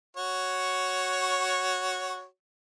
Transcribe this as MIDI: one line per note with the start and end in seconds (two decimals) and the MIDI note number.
0.17 2.25 66
0.17 2.25 73